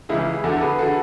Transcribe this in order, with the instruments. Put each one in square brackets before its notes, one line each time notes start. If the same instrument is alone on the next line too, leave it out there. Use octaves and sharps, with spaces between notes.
[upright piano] C#2 C#3 E3 E4 G#4
E2 D3 F#4 A4
G#4 B4
D3 F#4 A4